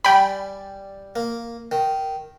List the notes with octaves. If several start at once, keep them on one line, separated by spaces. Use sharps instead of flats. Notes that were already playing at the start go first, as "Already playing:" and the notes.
G3 D5 G5 G#5 B5
A#3
D#3